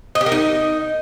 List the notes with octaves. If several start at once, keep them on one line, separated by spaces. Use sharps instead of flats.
D#5
G4
A#4
D#4